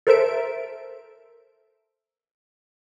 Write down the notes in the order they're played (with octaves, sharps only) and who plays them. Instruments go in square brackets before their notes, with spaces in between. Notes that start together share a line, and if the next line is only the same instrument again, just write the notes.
[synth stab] A4 A#4 C5 E5 D7